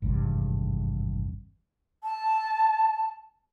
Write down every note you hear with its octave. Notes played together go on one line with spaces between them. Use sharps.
G#1 E2 G2 C3
A5